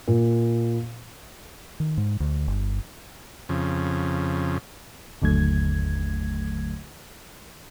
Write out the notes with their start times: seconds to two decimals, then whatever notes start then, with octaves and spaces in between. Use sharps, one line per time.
0.08 A#2
1.80 D#3
1.97 G#2
2.20 D2
2.48 G1
3.49 F2 C#3
5.22 G1 D#2 D3 F#3 A3 G#6